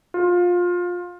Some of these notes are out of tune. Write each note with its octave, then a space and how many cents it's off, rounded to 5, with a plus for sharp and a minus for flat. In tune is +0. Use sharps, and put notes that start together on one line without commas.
F4 +20